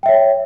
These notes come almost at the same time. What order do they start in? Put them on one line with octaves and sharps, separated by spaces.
G5 E5 C#5